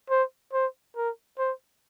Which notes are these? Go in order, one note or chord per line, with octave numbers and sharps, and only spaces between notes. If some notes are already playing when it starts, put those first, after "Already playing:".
C5
C5
A#4
C5